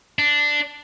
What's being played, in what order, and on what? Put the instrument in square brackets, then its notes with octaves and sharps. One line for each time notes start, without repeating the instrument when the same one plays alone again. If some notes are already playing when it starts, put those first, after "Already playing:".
[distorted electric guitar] D4